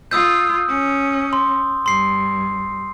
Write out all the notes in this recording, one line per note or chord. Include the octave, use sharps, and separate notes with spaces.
F4 D#6 E6 G6
C#4
C6
G2 C6 C7